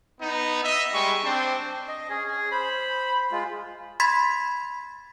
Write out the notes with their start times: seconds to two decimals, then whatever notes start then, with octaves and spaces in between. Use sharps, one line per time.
0.21 B3 D#4
0.63 D#5 E5
0.94 G3 G#3 C#6
1.24 C4 D4 C5
1.88 D#5
2.10 C#4 G#4
2.25 G#4
2.52 C5 B5
3.31 G#3 F4
4.00 B5 C6 G#6 A6 B6